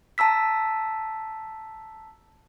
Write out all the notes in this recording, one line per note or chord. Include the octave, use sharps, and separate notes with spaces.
A5 A#5 E6 B6